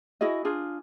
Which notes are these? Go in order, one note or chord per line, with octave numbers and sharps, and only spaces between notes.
E4 F#4 G#4 D#5
D4 F4 G#4